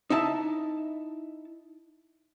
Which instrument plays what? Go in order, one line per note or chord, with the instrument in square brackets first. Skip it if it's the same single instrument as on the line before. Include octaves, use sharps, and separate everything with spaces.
[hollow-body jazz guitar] D#4 E4 E5 A5